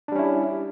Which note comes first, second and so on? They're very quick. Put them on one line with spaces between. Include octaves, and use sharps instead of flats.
D4 G3 C#4 E4